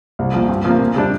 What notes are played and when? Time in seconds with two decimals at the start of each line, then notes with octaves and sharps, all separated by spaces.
0.19 C2
0.34 A#2 F3
0.49 G2
0.65 F3 A#3
0.80 A#2
0.96 G3 D4